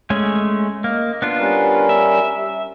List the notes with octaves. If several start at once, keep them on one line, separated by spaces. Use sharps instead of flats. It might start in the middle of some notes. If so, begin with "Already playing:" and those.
G#3 A3 C#4
A#3 D#5
B3 D4 F4
G3 C#4 A#4
E5